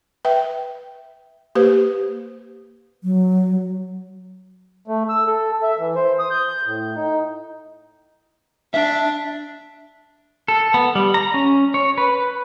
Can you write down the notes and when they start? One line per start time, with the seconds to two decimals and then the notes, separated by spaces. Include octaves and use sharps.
0.25 B4 E5 G5
1.55 A#3 G4 B4 C5
3.04 F#3
4.88 A3
5.09 E6
5.27 A4
5.63 E5
5.79 E3
5.95 C5
6.19 D#6
6.31 G6
6.66 A2
6.95 D#4
8.74 D4 E5
10.48 A4
10.74 B3
10.95 G3
11.14 A#5
11.34 C#4
11.74 C#5
11.98 B4